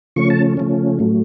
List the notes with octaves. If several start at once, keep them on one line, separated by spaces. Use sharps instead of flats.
C#3 F3 A3 C#4 C#6
A5
C#3 F3 A3 C#4
A2 F#3 A3